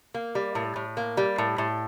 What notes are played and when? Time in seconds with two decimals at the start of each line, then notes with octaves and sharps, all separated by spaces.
0.14 A#3
0.35 G3
0.55 A2
0.76 A2
0.97 A#3
1.17 G3
1.38 A2
1.58 A2